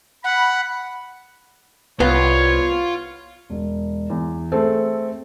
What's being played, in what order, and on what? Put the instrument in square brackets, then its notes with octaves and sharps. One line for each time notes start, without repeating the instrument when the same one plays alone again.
[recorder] F#5 [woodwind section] B5
[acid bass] C2 [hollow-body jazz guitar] B3 [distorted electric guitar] F4 [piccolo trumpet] C#5
[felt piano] E1
E2
A3 C4 G#4 A4